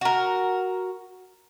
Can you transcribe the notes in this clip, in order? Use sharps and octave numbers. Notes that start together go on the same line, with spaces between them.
F#4 A#4